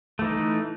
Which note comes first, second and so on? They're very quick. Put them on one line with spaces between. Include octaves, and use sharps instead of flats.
A3 E3 D#4